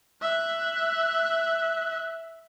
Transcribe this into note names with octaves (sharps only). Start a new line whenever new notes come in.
E5 F#6